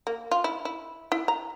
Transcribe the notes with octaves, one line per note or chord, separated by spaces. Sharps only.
A#3
F4
E4
E4
E4
A#5